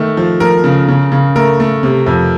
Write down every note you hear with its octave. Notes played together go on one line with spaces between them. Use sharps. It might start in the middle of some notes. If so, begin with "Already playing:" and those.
Already playing: D#3 A3
F3
F3 A#4
C#3
C#3
C#3
A3 A#4
A3
C3
F2